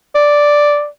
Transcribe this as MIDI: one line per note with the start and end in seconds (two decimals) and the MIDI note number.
0.15 0.86 74